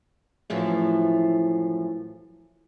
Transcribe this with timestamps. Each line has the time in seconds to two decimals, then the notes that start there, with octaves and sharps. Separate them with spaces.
0.50 F#2 A2 E3 F3